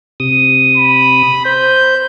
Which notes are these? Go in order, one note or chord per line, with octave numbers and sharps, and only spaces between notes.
C3 D#6
B5
C5 G6